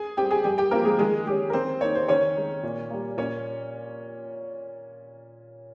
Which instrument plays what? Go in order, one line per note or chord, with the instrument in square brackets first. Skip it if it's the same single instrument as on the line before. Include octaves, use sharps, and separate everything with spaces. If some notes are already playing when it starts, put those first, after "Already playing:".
Already playing: [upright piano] G#4 G#5
G3 C4 G4 G5
G#4 G#5
G2 G4 G5
G4 G5
F3 A#3 C4 A#4
G#3 G#4
D#3 G#3 G#4
G#3 C#4 G4
A#4
D#3 C4 C5
A#3 D#4 C#5
C5
D#3 C#4 C#5
G#3 D#4
A#2
G3 A#3
A#2 C#4 C#5